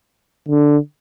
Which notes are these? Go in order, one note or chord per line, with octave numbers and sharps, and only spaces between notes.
D3